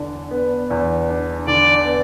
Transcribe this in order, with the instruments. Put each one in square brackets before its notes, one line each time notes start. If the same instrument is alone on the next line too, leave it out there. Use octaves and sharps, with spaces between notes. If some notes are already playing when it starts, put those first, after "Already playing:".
Already playing: [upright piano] E2 D3 D4
B3
E2
D4
[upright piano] D3 [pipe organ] D5
[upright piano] B3